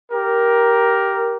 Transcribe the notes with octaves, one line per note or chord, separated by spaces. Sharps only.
G4 A#4